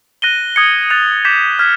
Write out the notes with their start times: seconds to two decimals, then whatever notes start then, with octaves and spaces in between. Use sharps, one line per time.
0.22 F#6 A#6 D#7 G7
0.56 D#6 G#6 C#7
0.90 F#6 A6 C#7 F7
1.25 D6 G6 B6 E7
1.59 F6 G#6 B6